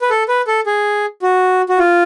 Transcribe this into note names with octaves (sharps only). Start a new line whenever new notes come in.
B4
A4
B4
A4
G#4
F#4
F#4
F4